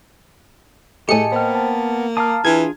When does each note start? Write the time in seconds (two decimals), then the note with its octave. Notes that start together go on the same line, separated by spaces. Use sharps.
1.09 A2 A3 G4 G#4 D#5 G#5 A5 C#7
1.32 A#3 B3 C5 G5 F6
1.55 A5
2.17 F5 A5 A#5 D6 D#6 F6
2.45 E3 D4 F4 G#4 G#6